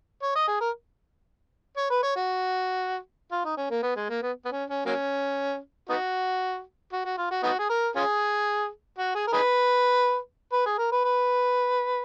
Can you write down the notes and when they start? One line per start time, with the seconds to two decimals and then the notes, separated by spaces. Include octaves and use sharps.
0.22 C#5
0.35 D#5
0.48 G#4
0.61 A#4
1.77 C#5
1.90 B4
2.03 C#5
2.16 F#4
3.32 F4
3.45 D#4
3.57 C#4
3.70 A#3
3.82 B3
3.96 G#3
4.09 A#3
4.22 B3
4.45 B3
4.52 C#4
4.69 C#4
4.86 F#3 A#3 C#4
5.89 B3 D#4 F#4
6.93 F#4
7.06 F#4
7.17 F4
7.31 F#4
7.43 B3 D#4 F#4
7.59 G#4
7.69 A#4
7.96 C#4 F4 G#4
8.98 F#4
9.15 G#4
9.27 A#4
9.33 D#4 G#4 B4
10.53 B4
10.66 G#4
10.78 A#4
10.92 B4
11.04 B4